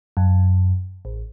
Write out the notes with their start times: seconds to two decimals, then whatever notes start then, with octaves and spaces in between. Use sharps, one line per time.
0.17 F#2
1.05 A1